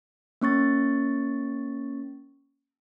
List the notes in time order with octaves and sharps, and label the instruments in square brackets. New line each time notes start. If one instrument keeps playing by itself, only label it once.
[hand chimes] A#3 C#4 C#6 A6